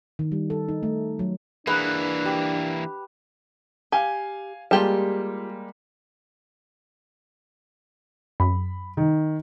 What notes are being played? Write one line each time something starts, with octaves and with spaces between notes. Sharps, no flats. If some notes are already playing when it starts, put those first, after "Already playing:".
D#3
G3
A4
D#4
A3
F#3
E3 A#3 D4 G#4 B4 F#5
G4
G4 F5 G#5
G3 G#3 A#3 F4 G4 A5
F#2 B5
D#3